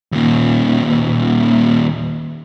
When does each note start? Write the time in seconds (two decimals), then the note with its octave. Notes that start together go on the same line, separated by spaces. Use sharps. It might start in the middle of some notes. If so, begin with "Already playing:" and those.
0.12 D#2 A#2